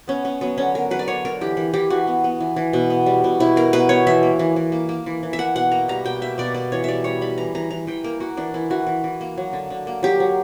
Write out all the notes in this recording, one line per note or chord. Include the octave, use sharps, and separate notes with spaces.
B3 C#4
B3 C#4
F#3 B3
D3 C#4
B3 A#4
F#3 B4
D5
D3 C#5
D3 A#4
E3 G4
E3
E3 G4
E3 F#4
B3
B3
E3
E3
B2
B3
G3
B2
B2 E4
B3 A#4
B2 B4
B3 C#5
E3 E5
A#3
E3
E3
A#3
A#3
E3
E3
E5
A#3 F#5
B2 F#5
A#3 A#5
G3 A#5
B2 G5
A#3 E5
B2 D5
A#3 D5
E3 C#5
G3 D5 E5
G3 C#5
G3 B5
E3 A#5
E3 A#5
E3 A#5
E3 G5
A#3 A#4
A#3 F#4
E3 D4
E3 E4
E3 F#4
E3
E3
A#3
F#3
D3
D3
A#3
F#3 G4
F#3